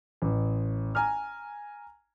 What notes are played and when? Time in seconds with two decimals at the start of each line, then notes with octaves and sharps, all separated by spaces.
0.22 A1
0.95 G#5 A#5 F6